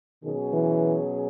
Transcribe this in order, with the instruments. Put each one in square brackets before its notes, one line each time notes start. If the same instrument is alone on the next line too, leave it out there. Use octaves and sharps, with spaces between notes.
[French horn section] B2 F#3 C#4 G#4 [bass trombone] D#3
[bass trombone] E3